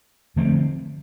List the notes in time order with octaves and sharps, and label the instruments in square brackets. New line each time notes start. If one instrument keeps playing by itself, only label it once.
[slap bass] D3 F3 A3 C4